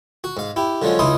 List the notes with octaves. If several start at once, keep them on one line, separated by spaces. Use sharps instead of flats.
F#4
G#2 F5
E4 G4
D3 F3 F#3 G#3 C#4
C#2 C#3 D#4 E4 C6 D#6